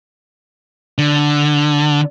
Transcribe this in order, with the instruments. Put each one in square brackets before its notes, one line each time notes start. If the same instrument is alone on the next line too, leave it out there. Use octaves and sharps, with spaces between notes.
[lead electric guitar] D3